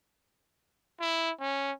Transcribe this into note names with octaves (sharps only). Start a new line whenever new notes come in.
E4
C#4